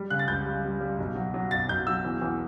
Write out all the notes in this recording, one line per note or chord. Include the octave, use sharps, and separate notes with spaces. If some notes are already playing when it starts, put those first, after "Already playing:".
Already playing: G3
C#3 F#6
A6
C#2 G6
G3
G3
G3
B1
F#3
F#3
B1 A6
B1 G6
F#3 E6
E2
E2